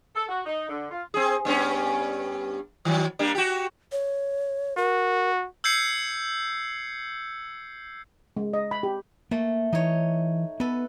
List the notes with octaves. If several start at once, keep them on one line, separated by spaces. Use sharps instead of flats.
A4
F#4
D#4
D3
F4
C4 G#4
G2 B3 C#4
D#3 F#3
G3 A#3 D4
F#4 G4
C#5
F#4 A#4
E6 G6 G#6 C7 C#7
G#3
D#5
B5
G4
A3 A#3
E3 D#4 C#5
B3 A4 B4